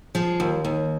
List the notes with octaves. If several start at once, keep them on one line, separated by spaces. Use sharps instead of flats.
F3 G#4
D#2
D#2